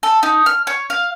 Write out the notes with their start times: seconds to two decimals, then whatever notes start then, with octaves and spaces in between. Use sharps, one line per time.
0.03 A4
0.23 D#4
0.46 F6
0.67 C#5
0.90 F5